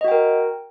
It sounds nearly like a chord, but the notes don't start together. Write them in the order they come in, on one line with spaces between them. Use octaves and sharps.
D#5 F#4 G5 A#4